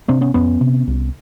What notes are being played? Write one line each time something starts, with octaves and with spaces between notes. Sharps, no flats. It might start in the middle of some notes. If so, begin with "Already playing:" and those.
C3 C4 D4
B3 C#4
F2 B3 C#4
C3
C2